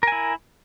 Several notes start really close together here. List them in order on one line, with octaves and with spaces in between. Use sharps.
A#4 G#5 E4